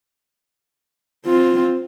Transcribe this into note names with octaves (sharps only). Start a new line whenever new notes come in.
C4 F4